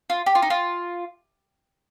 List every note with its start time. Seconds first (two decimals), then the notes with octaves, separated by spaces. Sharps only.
0.10 F4
0.26 G4
0.35 F4
0.42 D#4
0.50 F4